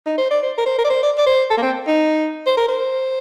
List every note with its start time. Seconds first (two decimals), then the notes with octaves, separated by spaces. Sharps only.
0.06 D#4
0.18 C5
0.31 D5
0.43 C5
0.58 A#4
0.66 C5
0.78 A#4
0.84 D5
0.90 C5
1.03 D5
1.18 D5
1.26 C5
1.50 A4
1.57 A#3
1.62 C4
1.87 D#4
2.47 C5
2.57 A#4
2.68 C5